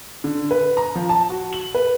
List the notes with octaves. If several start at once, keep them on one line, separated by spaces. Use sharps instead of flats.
D3
B4
A#5
F3
A5
F#4
F#7
B4